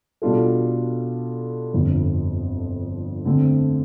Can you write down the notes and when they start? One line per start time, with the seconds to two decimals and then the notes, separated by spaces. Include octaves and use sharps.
0.22 B2 G3 D4 F4 A4
1.74 G1 F2 D3 F3
3.25 D3 A3 C4